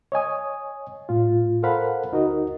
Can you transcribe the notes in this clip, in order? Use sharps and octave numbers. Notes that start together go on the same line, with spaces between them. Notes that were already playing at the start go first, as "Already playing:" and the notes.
C#5 D#5 G#5 D#6
A2 F4
A4 A#4 C5 F5 F#5 B5
D2 D#4 F#4 A#4 D#5